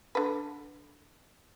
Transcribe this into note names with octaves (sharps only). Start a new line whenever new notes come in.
D3 B4